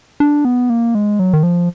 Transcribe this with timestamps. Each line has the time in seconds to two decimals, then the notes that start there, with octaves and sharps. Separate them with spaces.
0.20 D4
0.45 B3
0.70 A#3
0.95 G#3
1.19 F#3
1.33 D#3
1.43 F3